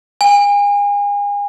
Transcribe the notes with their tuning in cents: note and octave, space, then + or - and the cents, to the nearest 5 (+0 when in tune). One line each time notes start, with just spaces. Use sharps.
G#5 -35